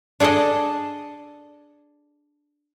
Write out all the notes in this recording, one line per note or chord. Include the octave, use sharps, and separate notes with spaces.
D4 G#4 A4 D5 D#5